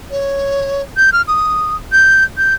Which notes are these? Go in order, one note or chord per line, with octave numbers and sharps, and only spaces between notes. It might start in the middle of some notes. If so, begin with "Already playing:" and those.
C#5
G6
F6
D#6
G6
G6